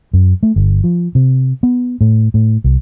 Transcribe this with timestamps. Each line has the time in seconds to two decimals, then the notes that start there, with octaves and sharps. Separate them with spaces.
0.13 F#2
0.43 A3
0.56 G1
0.84 F3
1.15 C3
1.63 B3
2.01 A2
2.34 A2
2.64 C2